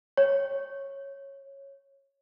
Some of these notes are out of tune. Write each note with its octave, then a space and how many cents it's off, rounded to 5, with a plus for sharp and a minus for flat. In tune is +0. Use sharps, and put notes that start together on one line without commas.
C#5 -10